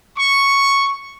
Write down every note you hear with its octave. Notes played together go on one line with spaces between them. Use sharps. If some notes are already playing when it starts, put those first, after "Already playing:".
C#6